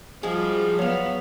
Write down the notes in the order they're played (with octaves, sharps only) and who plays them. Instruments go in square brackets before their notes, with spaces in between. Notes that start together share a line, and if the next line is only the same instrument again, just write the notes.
[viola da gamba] F3 G3 [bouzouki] G#3 F#4 G#4
[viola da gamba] F#3 B3 [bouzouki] C#4 F5